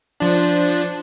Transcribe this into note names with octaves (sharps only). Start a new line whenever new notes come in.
F3 D4